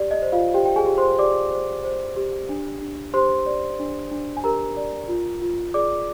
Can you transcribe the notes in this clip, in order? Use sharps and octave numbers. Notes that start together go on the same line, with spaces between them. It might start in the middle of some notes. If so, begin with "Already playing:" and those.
Already playing: G4 D5
D#5
C5
F4 F5
G4 C5 G5
G5
G#4 G#5
G4
C5 C6
G4 D5 D6
C5
C5
G4
D4
D4
G4 C5 C6
D5
D4
D4
G#5
G4 A#4 A#5
D5
F4
F4
G#4 D5 D6